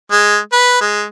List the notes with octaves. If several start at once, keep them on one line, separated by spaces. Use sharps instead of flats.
G#3
B4
G#3